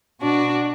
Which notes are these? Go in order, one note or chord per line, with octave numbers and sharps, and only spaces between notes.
B2 D4 F#4